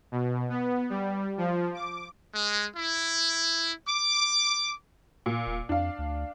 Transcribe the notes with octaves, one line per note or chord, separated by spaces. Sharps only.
B2
B3
G3
F3
D6
G#3
E4
D6
A#2
D#1
F2 D4 F5
D2